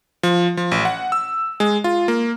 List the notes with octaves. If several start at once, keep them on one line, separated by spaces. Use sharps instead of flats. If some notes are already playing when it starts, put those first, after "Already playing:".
F3
F3
A1
F#5
E6
G#3
F4
A#3